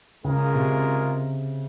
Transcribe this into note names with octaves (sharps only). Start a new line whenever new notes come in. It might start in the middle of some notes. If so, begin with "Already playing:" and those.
C#3 G#3 C#4 F4 A#4
C3